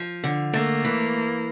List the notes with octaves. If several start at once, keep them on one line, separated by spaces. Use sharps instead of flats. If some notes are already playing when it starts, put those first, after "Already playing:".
Already playing: F3
D3
A3 A#3
E3